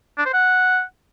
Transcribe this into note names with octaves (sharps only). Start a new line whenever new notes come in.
D4
C5
F#5